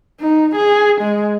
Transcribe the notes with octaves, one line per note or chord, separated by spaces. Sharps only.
D#4
G#4
G#3